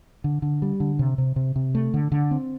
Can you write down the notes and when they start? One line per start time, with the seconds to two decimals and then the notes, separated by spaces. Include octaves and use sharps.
0.24 D3
0.42 D3
0.62 G3
0.80 D3
0.99 C3
1.18 C3
1.36 C3
1.56 C3
1.75 A3
1.94 D3
2.12 D3
2.31 C4